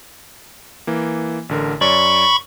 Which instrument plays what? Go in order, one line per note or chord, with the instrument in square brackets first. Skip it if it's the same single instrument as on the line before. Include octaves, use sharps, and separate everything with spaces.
[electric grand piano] E3 A#3
A1 D3 A#4
[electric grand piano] F#2 C#5 D5 [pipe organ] B5 C#6